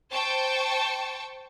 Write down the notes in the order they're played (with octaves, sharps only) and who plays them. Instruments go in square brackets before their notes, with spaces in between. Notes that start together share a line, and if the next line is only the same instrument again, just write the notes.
[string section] C5 G5 A5 C#6